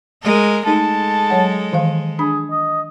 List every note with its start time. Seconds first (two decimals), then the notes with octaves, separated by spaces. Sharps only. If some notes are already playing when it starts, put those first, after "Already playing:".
0.22 G#3 A#4
0.66 G#3 A3 D#4 A4 A5
1.30 F#3 C#5 F#5
1.73 D#3 E3 F5
2.19 D4 G#4 B5
2.51 D#5